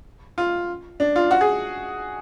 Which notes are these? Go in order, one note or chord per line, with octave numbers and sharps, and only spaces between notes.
F4
D4
F4
F#4
G#4